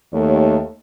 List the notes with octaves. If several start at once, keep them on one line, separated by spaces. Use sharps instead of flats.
D#2 A3 C#5